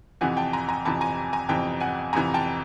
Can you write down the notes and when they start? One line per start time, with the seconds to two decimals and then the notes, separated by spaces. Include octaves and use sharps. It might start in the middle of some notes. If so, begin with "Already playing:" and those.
0.21 F2 C3 E3 F#5 G#5
0.37 G5 A5
0.53 G#5 A#5
0.69 G#5 A#5
0.85 F2 C3 E3 A5 B5
1.01 G#5 A#5
1.33 G#5 A#5
1.49 F2 C3 E3 G5 A5
1.80 F#5 G#5
2.13 F2 C3 E3 G#5 A#5
2.34 G5 A5